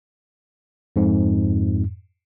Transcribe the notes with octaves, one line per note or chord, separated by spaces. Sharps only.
F2 G#2